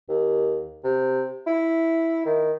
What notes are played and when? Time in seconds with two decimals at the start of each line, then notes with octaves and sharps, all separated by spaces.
0.09 D#2
0.84 C3
1.46 E4
2.25 D#3